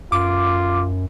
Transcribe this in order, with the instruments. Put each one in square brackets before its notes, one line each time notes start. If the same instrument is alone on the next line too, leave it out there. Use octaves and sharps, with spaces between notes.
[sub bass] F#2 [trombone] F4 [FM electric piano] D6